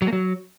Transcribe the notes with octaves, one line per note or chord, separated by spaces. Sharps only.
F#3
A#3
F#3